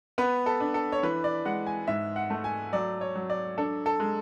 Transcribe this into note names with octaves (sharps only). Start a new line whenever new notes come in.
B3 B4
A4
D4
A4
C#5
E3 B4
D5
G#3 F#5
G#5
G#2 E5
F#5
A3
G#5
F#3 D5
C#5
F#3
D5
D4 A4
A4
G#3